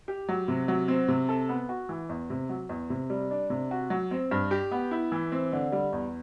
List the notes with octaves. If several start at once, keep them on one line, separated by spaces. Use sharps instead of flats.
G4
F#3
C3
F#3
C4
C3
A4
B3
F#4
E3
E2
C3
F#3
E2
C3
G3
D4
C3
F#4
F#3
C4
G2
G4
B3
E4
E3
C4
D3
G3
E2